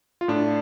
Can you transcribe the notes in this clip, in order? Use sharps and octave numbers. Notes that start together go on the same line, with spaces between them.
F4
A2 D4